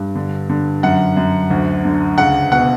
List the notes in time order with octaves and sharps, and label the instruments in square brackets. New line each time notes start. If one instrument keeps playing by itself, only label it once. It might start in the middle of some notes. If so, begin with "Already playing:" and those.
Already playing: [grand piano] G2
D3
D3
F#2 F#5
F#2
D2
D3
C#2 F#5
B2 F#5